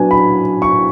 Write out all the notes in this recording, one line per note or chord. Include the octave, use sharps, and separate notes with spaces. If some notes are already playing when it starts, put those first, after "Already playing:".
Already playing: F#3 B3 D4 G#5
B5
C#6